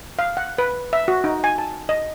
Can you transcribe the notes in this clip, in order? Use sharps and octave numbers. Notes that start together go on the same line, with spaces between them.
F5
F#5
B4
E5
F#4
D#4
G#5
A5
D#5